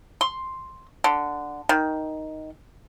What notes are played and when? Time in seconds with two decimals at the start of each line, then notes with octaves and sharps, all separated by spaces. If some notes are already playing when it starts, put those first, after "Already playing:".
0.21 C6
1.04 D3
1.69 D#3